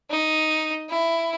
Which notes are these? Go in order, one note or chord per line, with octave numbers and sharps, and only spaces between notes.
D#4
E4